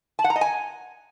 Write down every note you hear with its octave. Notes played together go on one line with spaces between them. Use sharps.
A5
F#5
A#5
D#5
G#5